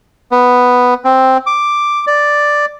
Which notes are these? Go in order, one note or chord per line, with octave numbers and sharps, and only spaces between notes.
B3
C4
D6
D5